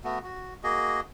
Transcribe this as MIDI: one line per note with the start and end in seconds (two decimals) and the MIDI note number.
0.04 0.19 57
0.04 0.19 59
0.04 0.19 66
0.24 0.54 66
0.63 1.01 58
0.63 1.01 66
0.63 1.01 68
0.63 1.01 75